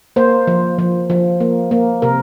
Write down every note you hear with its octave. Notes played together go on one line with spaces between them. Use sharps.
A#3 C5
F3
F3
F3
A#3
A#3
C3 A#4